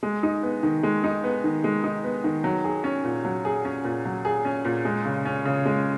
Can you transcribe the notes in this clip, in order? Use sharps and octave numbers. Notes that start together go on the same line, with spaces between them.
G#3
D#4
B3
D#3
G#3
D#4
B3
D#3
G#3
D#4
B3
D#3
F#3
G#4
C#4
A#2
F#3
G#4
C#4
A#2
F#3
G#4
C#4
A#2
G#3
C#3
C#4
C#3
G#3